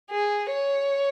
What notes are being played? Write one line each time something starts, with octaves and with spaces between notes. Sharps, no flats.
G#4
C#5